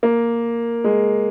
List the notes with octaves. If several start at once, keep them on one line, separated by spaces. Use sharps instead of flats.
A#3
G#3